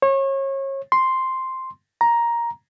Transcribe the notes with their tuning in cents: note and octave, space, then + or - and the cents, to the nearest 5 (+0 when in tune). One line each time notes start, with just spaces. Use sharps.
C#5 -30
C6 +0
A#5 +10